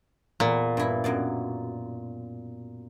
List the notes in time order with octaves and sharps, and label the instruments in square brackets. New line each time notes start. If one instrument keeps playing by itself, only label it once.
[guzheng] E2 B4 [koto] A#2
[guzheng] G2 E4
F#2 B2 D5